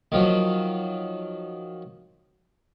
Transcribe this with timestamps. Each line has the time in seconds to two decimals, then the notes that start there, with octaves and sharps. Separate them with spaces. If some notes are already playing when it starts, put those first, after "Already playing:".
0.12 D#3 F3 F#3